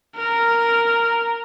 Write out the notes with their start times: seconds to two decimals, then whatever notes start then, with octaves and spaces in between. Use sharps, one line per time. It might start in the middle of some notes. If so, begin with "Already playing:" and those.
0.17 A#4